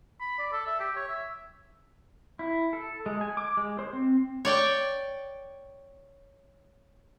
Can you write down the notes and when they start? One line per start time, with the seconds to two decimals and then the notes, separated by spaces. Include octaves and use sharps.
0.20 B5
0.38 D5
0.52 A4
0.67 E5
0.80 G4
0.96 C#5
1.09 E5
2.39 E4
2.73 A4
3.06 G#3
3.21 G#5
3.37 D6
3.57 G#3
3.79 C5
3.93 C4
4.45 C#5 D5 G5